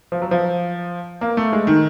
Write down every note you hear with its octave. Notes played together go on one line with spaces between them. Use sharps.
F3
F#3
F3
A#3
A3
G#3
D#3